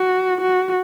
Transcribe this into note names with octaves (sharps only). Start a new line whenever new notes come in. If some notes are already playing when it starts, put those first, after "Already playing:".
Already playing: F#4
F#4